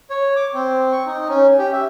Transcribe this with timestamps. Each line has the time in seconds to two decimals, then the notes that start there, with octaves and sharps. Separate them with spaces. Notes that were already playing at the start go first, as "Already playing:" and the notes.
0.10 C#5
0.36 D6
0.54 C4
0.92 C#6
1.06 D#4
1.29 C#4
1.58 G4
1.72 E5